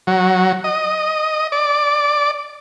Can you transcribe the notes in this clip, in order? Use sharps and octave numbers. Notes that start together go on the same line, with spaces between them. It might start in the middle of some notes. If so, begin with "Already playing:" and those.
F#3
D#5
D5